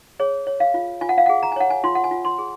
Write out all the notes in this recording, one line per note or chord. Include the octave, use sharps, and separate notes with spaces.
G#4 C#5
C#5
F5
F4
F4 G#5
F#5
F5
G#4 F#5
A#5
G#5
C#5 F#5
G#5
F4 C6
F#5
G#5
F4
C6
G#4